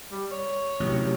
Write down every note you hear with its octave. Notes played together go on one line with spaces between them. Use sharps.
G3
C#5
A1 C3 F#3